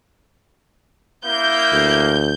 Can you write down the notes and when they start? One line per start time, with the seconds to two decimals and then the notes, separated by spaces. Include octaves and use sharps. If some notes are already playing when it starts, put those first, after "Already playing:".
1.26 A#3 E4 G6
1.72 D2